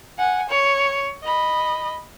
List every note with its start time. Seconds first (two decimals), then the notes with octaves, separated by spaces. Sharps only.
0.18 F#5 G#5
0.50 C#5
1.23 D#5 B5